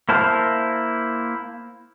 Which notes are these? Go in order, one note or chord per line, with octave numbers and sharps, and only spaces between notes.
A#3 E4 C5 A5 F6